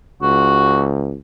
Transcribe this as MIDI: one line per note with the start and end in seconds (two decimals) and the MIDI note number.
0.22 1.16 37
0.22 0.84 66